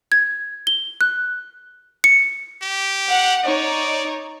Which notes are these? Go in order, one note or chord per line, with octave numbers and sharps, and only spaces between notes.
G#6
G7
F#6
C#7
G4
F#5
D#4 C#5 D5